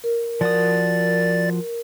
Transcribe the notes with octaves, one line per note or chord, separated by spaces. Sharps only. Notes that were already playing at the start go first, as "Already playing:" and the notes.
A#4
F3 F#4 D5 D#6 A6